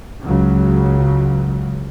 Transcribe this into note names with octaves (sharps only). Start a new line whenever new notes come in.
C#2 C#3 F#3